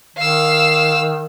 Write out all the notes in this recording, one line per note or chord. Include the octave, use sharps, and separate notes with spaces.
D#3 F5 E6